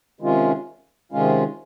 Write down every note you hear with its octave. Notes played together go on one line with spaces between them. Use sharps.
C3 D#3 G#3 C#4 F4
C3 D#3 G#3 C#4 F4